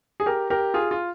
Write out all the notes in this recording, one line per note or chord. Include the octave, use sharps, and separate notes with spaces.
G#4
G4 A#4
G4 A#4
F4 G#4
F4